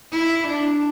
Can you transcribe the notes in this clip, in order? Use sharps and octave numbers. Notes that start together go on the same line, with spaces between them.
E4
D4